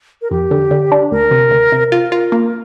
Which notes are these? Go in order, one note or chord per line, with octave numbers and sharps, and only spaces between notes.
A#4
F2 G4
D3
D3
D4
D2 A#4
C3
D2
C3
F4 A#4
F4
A#3